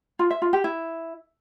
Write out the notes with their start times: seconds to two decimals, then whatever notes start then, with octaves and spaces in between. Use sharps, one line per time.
0.19 F4
0.30 E5
0.42 F4
0.53 G4
0.64 E4